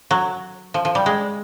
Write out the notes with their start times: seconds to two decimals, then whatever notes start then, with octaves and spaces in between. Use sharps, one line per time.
0.11 F#3
0.74 F3
0.85 F3
0.95 G3
1.06 G#3